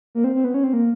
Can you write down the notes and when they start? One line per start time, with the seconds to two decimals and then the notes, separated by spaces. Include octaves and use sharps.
0.15 A#3
0.24 C4
0.35 C4
0.44 B3
0.54 C#4
0.64 C4
0.73 A#3